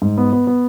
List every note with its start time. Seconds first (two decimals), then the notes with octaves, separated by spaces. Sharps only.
0.02 G#2
0.18 B3
0.33 B3
0.47 B3